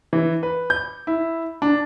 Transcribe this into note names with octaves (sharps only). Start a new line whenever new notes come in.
E3
B4
G6
E4
D4